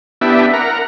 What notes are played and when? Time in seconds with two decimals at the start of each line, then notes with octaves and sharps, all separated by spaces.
0.21 B3 D4 E4 G4 E5
0.54 A#4 F#5 A#5